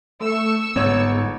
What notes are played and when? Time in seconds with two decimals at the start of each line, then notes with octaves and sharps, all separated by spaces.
0.21 A3 C#6 E6
0.76 G1 G#2 B3 C#5